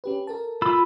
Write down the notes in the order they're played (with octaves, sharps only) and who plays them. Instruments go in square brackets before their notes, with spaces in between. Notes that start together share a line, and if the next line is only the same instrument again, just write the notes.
[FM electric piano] C#4 G4 B4
A4 A#4 A5
[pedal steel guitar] F4 B5 E6